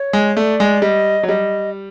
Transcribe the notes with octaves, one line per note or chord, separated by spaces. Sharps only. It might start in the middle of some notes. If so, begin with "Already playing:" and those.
Already playing: C#5
G#3
A3 D5
G#3
G3 D#5
F#3
G3 D#5